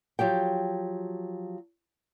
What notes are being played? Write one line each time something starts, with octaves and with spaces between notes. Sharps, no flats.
F3 F#3 G4 G5